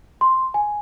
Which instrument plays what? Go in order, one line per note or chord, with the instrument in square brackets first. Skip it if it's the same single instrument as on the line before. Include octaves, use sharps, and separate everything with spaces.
[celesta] C6
G#5